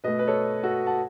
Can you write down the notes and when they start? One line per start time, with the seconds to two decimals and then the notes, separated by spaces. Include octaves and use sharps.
0.04 B2 A3 B4 D#5
0.19 B4
0.27 A4 C#5
0.64 F#4 A4
0.87 F#5 A5